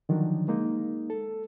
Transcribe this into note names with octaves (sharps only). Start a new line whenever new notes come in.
D3 D#3 F3 F#3 D4
G#3 A#3 D#4
A4